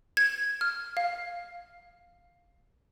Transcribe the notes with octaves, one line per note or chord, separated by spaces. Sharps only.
G#6
F6
F5